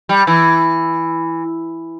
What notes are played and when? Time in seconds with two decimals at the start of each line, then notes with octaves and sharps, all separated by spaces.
0.09 G3
0.27 E3